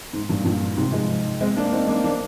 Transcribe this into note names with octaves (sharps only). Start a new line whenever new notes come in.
G#2
G2 A#2
G2 A#2
G#2 C3
F3 G#3
G#3 C4
A#3 D4
C4 D#4
A#3 D4
A#3 D4